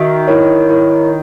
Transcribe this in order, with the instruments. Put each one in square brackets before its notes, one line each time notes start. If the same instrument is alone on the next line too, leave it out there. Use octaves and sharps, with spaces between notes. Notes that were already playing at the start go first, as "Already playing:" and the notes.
Already playing: [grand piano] D#3 [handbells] F#4 E5
[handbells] E4 A#4 C#5
E4 A#4 C#5